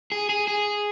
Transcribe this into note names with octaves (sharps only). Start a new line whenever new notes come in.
G#4
G#4
G#4